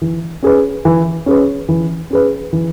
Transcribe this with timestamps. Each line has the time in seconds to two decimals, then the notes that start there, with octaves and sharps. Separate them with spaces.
0.02 E3
0.43 C#4 G#4 B4
0.85 E3
1.26 C#4 G#4 B4
1.69 E3
2.10 C#4 G#4 B4
2.53 E3